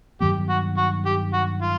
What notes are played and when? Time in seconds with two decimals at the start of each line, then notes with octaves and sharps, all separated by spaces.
0.21 G2 D#3 F#3 B3 G4
0.49 F#4
0.78 F#4
1.06 G4
1.33 F#4
1.62 F4